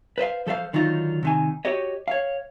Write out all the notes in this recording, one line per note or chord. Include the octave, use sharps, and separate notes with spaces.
B4 C5 D#5 F5
F3 A4 C5 E5 F5
D3 D#3 F#3 D#4 F4
C3 D#3 G#5
F#4 G4 C#5 D#5
C#5 F5